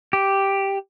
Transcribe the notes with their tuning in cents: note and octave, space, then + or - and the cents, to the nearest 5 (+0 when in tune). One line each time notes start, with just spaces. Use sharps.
G4 +0